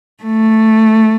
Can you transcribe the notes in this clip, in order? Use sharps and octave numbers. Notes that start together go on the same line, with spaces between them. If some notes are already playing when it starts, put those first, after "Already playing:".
A3